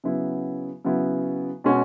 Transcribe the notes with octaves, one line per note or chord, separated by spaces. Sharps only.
C#3 F#3 B3 E4
C#3 F#3 B3 E4
B2 G#3 C#4 F#4